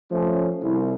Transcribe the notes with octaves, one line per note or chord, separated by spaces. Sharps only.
F3 A3 C#4
C2